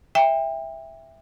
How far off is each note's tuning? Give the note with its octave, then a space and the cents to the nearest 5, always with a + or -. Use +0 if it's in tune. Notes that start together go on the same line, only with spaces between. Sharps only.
E5 +0 G5 +30